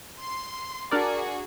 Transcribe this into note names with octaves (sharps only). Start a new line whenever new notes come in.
C6
D4 F#4 G#4 A#4 D5